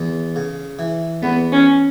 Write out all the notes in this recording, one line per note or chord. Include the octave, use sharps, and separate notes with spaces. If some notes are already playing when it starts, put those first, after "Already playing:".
Already playing: E2
C#3
E3
E2 B3
C#4